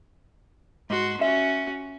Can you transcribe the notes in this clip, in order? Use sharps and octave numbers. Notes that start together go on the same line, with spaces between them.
G#2 F#4 C6
C#4 F#4 E5